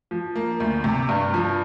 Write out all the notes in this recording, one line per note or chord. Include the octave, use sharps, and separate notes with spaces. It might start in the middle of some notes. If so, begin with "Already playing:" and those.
F3
A#3
D2
C3
G2
F3